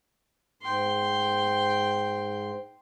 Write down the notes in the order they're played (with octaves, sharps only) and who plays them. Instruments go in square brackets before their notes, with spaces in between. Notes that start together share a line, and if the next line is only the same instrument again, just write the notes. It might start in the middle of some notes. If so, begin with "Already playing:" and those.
[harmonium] G#2 [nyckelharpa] G5 C6